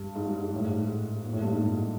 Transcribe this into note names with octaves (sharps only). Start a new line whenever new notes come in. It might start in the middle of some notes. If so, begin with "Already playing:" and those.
Already playing: G2
G#2
G2
G#2
A2
G#2
A#2
A2
G2
G#2
G2